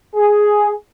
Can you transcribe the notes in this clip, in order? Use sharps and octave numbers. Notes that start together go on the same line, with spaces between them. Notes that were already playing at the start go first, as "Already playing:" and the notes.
G#4